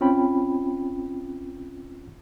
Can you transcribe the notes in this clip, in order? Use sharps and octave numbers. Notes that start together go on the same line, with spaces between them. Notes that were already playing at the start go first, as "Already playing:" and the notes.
C4 C#4 F4 G5 B5